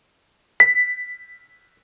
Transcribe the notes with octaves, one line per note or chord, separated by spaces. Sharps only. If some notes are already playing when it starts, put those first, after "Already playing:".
B6